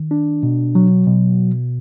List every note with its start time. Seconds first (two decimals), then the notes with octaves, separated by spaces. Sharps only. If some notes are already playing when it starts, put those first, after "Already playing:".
Already playing: D#3
0.11 D4
0.43 B2
0.75 F#3
1.07 B2